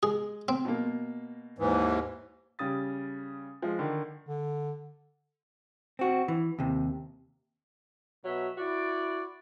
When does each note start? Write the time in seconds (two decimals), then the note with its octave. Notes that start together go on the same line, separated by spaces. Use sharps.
0.03 G#3 G#4
0.48 C4
0.65 B2 A#3
1.58 D#2 G#2 E3
2.59 C#3 G3 D#6 A6
3.62 F3 G#3
3.79 D3 D#3
4.27 D3
5.99 C4 F#4
6.28 E3
6.59 D#2 C3
8.24 B2 F#3 E5
8.58 E4 F#4 D5